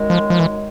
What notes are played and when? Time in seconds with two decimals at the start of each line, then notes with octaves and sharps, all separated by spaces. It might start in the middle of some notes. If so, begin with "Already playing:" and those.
Already playing: F#2 D#3 G#3
0.10 F3
0.30 F3
0.39 E3